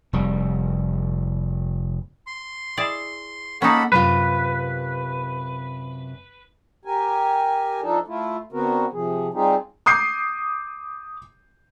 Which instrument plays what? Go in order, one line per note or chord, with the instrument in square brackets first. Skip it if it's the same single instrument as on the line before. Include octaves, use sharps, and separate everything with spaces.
[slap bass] F1 G3
[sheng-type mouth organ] C6
[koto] E4 G#4 D5
[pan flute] A#3 [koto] C#4 D#4 [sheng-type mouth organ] A4 F#5 B5
[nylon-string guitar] F#2 C3 F4 [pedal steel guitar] B4
[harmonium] G4 A#4 G#5
F3 D4 D#4 A4
A3 E4 F4
D3 B3 C4 F#4 A#4
C3 F3 G#4
G3 C4 D#4 F4 G4 G#4
[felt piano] D6 D#6 G6 C7